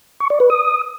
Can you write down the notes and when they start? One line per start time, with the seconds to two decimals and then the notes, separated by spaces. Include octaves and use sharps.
0.20 C#6
0.30 D5
0.40 B4
0.50 D#6